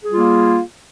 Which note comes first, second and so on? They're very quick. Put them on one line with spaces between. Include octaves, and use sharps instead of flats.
G#4 G3 F4 A#3